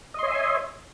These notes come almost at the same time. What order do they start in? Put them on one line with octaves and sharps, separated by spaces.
D#5 C6 C#5 E5 G#5